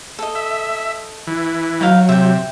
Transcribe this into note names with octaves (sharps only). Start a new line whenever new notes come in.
A4 D#5
E5
E3
F#3 D#4 F5
C3 E5 G5